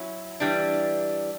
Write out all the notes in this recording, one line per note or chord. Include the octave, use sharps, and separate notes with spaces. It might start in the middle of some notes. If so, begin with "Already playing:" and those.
Already playing: F#3 C#4 E4
E3 G3 D4